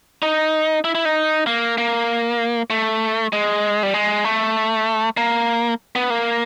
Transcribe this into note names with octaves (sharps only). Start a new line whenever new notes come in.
D#4
E4
E4
D#4
A#3
A#3
A3
G#3
G3
G#3
A3
A#3
B3
A#3